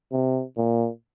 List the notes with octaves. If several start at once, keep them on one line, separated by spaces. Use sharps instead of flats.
C3
A#2